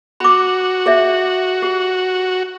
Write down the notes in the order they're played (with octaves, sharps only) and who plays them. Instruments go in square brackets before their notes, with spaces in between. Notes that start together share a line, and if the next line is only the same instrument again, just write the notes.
[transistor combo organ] F#4 [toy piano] B5 D6
[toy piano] G#4 D5 E5
G4